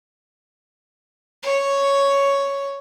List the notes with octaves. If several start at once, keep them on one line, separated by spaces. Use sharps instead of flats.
C#5